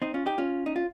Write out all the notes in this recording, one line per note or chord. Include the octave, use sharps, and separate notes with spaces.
C4 D#4
C#4 F4
D#4 G4
C#4 F4
D#4
F4